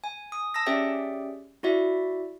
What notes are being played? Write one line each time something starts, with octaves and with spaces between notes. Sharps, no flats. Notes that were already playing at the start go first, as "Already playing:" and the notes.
G#5
D#6
A5 E6 A#6
C#4 G4 G#4 D5 E5 G5
E4 F#4 D5 E5